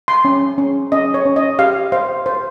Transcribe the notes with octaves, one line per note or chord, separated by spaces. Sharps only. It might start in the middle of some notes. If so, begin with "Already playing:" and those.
C6
C#4
C#4
C#4 D#5
C#5
C#4
D#5
G4 F5
C5 F5
C5